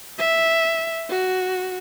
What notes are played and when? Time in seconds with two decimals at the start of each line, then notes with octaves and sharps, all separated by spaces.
0.19 E5
1.10 F#4